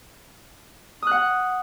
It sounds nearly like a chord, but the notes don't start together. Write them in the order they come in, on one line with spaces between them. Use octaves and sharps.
D#6 F#6 F#5